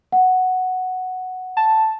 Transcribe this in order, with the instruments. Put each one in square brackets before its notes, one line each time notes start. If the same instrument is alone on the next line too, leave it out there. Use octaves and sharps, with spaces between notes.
[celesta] F#5
[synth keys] A5